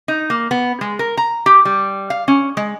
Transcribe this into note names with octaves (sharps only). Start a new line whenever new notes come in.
D#4
A#3
B3
G#3
A#4
A#5
G4
G3
F5
C#4
G#3